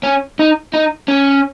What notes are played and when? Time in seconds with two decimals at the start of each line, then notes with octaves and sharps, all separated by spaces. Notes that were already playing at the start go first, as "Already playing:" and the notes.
0.03 C#4
0.39 D#4
0.74 D#4
1.08 C#4